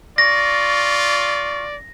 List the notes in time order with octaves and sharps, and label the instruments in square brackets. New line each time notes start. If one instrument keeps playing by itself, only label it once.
[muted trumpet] F4 [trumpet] D5 [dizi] C#6 [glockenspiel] A#6